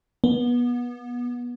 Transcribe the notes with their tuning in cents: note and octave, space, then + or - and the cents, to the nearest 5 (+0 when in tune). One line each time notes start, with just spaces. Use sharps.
B3 -25